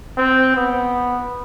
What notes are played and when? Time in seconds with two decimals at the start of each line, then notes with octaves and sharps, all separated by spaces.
0.18 C4
0.56 B3